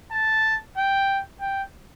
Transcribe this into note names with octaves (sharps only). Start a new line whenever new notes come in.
A5
G5
G5